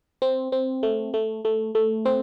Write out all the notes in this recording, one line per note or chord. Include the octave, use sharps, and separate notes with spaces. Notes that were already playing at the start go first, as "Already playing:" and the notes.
C4
C4
A3
A3
A3
A3
C4